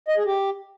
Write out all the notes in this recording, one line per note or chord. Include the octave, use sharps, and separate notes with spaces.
D#5
G#4
G4